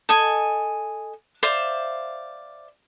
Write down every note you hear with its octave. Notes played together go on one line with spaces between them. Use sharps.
A4 D#5 G#5
C5 D5 E5 F5